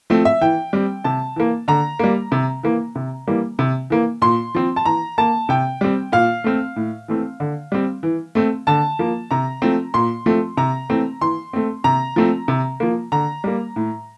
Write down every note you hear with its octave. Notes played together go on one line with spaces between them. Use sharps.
F3 A3 C4
E5
E3 G5
G3 C4
C3 A5
E3 A#3
D3 A#5
G3 A#3
C3
E3 A#3
C3
E3 G3 A#3
C3
E3 A#3
A#2 C6
F3 C4
A5
E3 A#5
A#3 A5
C3 G5
G3 C4
A#2 F5
A3 C4
A2
E3 A3 C4
D3
G3 C4
E3
A3 C4
D3 A5
F3 A#3
C3 A#5
F3 A3 C4
A#2 C6
F3 A3 C4
C3 A#5
E3 A3 C4
E3 C6
A3 C4
C3 A#5
F3 A3 C4
C3
F3 A#3
D3 A#5
G3 A#3
A2